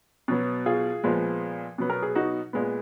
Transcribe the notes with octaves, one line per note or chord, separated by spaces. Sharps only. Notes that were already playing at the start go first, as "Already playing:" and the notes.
B2 F#3 B3
F4 G#4
A#2 F3 G#3 B3
B2 F#3 B3
A#4
G#4
D#4 F#4
A#2 G#3 B3